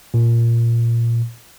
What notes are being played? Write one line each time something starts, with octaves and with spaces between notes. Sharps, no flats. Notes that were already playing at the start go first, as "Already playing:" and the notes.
A#2